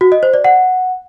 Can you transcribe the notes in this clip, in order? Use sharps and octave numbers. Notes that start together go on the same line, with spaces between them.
F#4
D#5
C5
D5
F#5